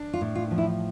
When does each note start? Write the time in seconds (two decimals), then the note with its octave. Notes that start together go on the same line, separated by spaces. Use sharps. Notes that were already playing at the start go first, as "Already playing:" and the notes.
Already playing: D4
0.13 F4
0.21 A2
0.35 F4
0.51 F3
0.58 E4